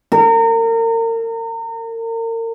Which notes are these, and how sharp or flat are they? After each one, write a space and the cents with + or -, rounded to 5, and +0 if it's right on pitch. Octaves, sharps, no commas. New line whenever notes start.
A#4 -35